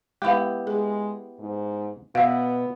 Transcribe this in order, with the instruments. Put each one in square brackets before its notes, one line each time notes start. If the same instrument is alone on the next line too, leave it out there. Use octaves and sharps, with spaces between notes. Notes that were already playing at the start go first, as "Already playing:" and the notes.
[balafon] G#3 F5 B5 [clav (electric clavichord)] B3 E4 G4
[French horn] G#3 [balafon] G#4
[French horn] G#2
[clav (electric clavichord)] B2 E5 [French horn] B3 [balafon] F5